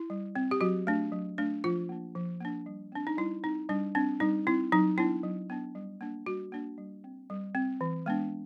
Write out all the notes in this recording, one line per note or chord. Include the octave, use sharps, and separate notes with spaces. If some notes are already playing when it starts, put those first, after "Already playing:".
Already playing: E4
G3
C4
G4
F#3 F#4
A3 D4
F#3
A3 D4
F3 F4
A#3 D4
F3
A#3 D4
G3
C4 D4
D#4
G3 E4
C4 D#4
G3 D4
C4 D4
G3 D#4
C4 E4
F#3 D#4
B3 D4 E4
F#3
B3 D4
G3
A#3 D4
G3 F#4
A#3 D4
G3
C4
G3
C4
E3
G#3 B3 D4